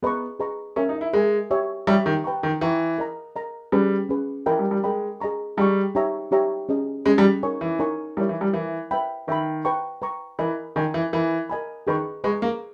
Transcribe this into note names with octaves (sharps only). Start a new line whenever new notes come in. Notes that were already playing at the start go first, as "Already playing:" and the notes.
B3 G#4 B4 D#5 A#5 C#6
G#4 B4 D#5 A#5 C#6
C#4 A#4 E5 G#5
D#4
E4
G#3 A#4 E5 G#5
G4 C#5 E5
G3 G4 C#5 E5
D#3
B4 G5 A#5 C#6
D#3
E3 B4 G5 A#5 C#6
A#4 D#5 A#5
A#4 D#5 A#5
G3 C#4 G#4 B4
C#4 G#4 B4
E3 A#4 D#5 G5 B5
G3
G3
G#3 A#4 D#5 G5 B5
G#4 D#5 A#5 C#6
G3 G#4 D#5 A#5 C#6
D#4 G4 C#5 E5 A#5
D#4 G4 C#5 E5 A#5
C#4 G#4 D#5
G#3 C#4 G#4 D#5
G3
D#4 A#4 C#5 G#5 C#6
E3
D#4 A#4 C#5 G#5 C#6
G3 E4 A#4 C#5
E3
G3
E3 E4 A#4 C#5
B4 E5 G5 B5
D#3 B4 E5 G5 B5
B4 G5 A#5 C#6
B4 G5 A#5 C#6
E3 A#4 D#5 G#5 B5
D#3 A#4 D#5 G#5 B5
E3
E3 A#4 D#5 G#5 B5
A#4 D#5 G#5 B5
D#3 G#4 B4 D#5 A#5 C#6
G#3 G#4 B4 D#5 A#5 C#6
A#3